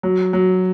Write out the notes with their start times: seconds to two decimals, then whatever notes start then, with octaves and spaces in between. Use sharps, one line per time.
0.03 F#3
0.33 F#3